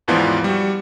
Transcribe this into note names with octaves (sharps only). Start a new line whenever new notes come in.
D#2 G#2 E3 F3 B3 D5
G3 F#4